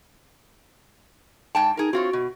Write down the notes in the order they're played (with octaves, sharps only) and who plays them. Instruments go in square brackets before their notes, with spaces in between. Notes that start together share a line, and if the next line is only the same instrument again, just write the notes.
[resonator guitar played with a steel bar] G#2 G5 A5
[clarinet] D#4 [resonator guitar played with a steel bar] G#4 A#4
[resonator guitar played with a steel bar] C4 F4 C#5 [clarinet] F#4
[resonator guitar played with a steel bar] B2